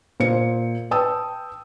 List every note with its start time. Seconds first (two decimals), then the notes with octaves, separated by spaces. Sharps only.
0.20 A#2 C5 C#7
0.91 B4 G5 A5 D#6 E6